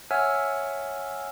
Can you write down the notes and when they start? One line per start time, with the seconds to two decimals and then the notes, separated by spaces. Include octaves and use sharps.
0.11 C#5 E5 F#5 G#5 E6 F6